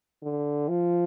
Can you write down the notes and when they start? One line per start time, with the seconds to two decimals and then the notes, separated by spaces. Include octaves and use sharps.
0.23 D3
0.68 F3